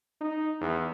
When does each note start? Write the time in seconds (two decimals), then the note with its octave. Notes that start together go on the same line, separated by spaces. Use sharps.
0.21 D#4
0.61 E2